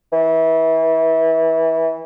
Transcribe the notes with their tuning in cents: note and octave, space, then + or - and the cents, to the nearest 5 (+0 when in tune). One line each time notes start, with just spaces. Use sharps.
E3 -25